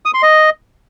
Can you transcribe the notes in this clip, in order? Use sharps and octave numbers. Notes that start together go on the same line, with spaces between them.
D#6
C6
D#5